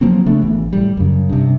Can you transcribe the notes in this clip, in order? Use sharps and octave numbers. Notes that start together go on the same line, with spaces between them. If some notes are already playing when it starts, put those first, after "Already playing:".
F3 F#3 A#3 C4
C#3 A3 B3 D4
G#1 E3
A2 G3
F#2 C#3
G2 C3